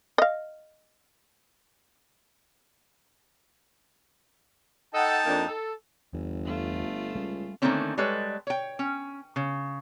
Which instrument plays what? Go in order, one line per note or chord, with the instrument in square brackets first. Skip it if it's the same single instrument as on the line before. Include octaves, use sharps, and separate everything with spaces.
[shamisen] D#5 F5
[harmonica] D#4 G5 A5 [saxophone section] A4 D#5 F#5
[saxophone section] F2 A#3 D4
A4
[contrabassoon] G1 [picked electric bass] E2
[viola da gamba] A3 F4
[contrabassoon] C#2 [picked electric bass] G3 B3 C#4
[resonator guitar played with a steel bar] D3 D#3 A3 A#3 C4 C#4
G3 G#3 A4 B4 C#5
C#5 G5
C#4
C#3